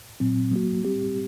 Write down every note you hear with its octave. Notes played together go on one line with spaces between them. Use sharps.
A#2 F#3 C4
F#3 A#3 F#4
G3 C4 G4